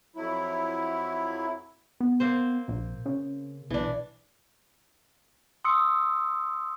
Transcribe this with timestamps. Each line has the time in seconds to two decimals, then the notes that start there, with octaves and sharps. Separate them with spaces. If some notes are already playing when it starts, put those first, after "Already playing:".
0.16 F2 F#3 E4
2.00 B3
2.20 A#3 C4 C5
2.68 A#1
3.06 C#3
3.70 B1 E3 D4
5.65 C6 D#6 E6 C#7